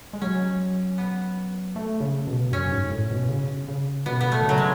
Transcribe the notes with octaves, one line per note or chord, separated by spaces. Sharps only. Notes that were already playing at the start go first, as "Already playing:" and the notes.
G#3
F#3 C#4
B3
A3
C#3
B2
F#2 C#4
G#2
A2
B2
C#3
C#3
B2 B3
B3
A3
D#3
C#3 F#3
G#3